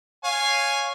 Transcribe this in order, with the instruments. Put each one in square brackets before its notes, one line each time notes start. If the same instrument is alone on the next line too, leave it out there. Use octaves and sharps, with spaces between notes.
[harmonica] C#5 F5 G#5